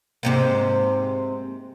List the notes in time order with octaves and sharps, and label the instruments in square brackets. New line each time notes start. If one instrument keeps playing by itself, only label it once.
[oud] G#2 C3 A#3